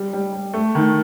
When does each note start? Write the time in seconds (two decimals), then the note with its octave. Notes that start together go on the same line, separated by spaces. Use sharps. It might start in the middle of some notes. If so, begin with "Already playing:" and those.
Already playing: G3
0.13 G3
0.33 G3
0.53 A3
0.75 D#3